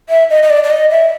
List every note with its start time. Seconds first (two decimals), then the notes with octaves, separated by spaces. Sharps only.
0.09 E5
0.30 D#5
0.43 D#5
0.50 D5
0.64 D5
0.70 D#5
0.91 E5